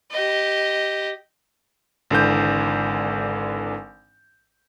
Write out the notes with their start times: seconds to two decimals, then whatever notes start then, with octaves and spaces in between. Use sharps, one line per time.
0.11 G4 D#5
2.11 G#1 D3 E3 G6